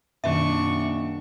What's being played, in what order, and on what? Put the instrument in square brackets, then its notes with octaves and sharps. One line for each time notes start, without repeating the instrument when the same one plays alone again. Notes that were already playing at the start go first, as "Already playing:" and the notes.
[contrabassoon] D#1 [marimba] F#2 B2 D#3 [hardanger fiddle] D4 C#6 [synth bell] E5